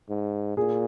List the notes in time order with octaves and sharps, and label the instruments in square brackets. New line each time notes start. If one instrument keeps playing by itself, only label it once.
[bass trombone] G#2
[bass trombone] A#2 [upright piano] G#4